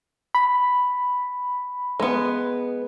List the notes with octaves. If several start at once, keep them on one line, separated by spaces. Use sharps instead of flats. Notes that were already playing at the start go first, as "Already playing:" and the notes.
B5
G#3 B3